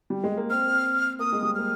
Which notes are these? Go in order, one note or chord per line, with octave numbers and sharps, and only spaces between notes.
G3
G#3
A#3
C4 F6
A#3 D#6
G#3
G3
A#3 F6